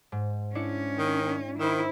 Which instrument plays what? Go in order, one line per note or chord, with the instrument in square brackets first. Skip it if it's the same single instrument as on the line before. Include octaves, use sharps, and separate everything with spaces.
[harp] G#2
[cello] C#4 [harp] D4 E4 C#7
[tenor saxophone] D#3
[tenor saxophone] D#3 [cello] E4 [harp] C5 E6